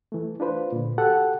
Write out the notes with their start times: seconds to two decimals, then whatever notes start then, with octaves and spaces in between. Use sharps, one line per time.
0.12 E3 A3
0.40 D4 F4 B4 C5
0.72 A#2 D3
0.98 F#4 G4 A4 F#5